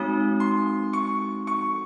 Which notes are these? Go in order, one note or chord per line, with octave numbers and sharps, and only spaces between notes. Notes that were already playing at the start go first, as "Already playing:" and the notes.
Already playing: G#3 C4 D#4 F#4 D#6
C6
C#6
C#6